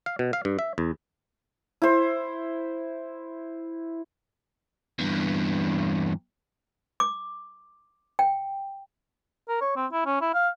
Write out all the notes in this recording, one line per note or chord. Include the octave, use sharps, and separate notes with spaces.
F5
B2
F5
G2
E5
E2
E4 C5
E2 G2
D6
G5
A#4
C#5
C4
E4
C#4
E4
F5